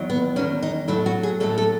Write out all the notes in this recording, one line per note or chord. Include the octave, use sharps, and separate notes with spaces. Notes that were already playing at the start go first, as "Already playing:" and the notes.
Already playing: E2 D#3 F#3
B3
E2 D#3 F#3 C#4
D#4
A2 F#3 A3 E4
F#4
G#4
A2 F#3 A3 A4
A4